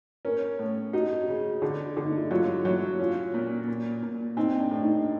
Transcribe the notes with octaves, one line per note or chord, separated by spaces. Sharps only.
C#4 A#4
A2
D#4 F#4
C#3
D3
D3
D#4
E4
F#3 F4
F#3 E4
C#4 F4
A#2
A#2
A#2
C4 D#4
D4
A2
D#4